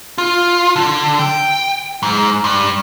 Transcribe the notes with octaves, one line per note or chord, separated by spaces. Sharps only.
F4
D3
G5
G#2
G2